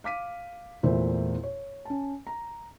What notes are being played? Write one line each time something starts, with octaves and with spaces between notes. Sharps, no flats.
F5 D6 B6 D#7
E2 A#2 A3 E4 C5
C#5
C#4 A5
A#5